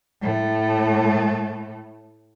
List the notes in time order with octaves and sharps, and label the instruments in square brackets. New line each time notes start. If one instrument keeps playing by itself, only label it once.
[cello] A2 A3